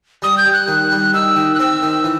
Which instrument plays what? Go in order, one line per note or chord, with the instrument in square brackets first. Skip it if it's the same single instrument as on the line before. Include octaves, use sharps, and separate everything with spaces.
[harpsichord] G3 [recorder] D#6
[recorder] G6
[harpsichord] G3
[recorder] F#6
[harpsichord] D#3
G3
[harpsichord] D#3 [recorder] E6
[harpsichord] D#3
[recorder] F#6
[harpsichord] C4 [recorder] E6
[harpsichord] D#3
E3